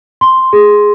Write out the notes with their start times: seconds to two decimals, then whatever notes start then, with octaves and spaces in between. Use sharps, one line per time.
0.21 C6
0.53 G#4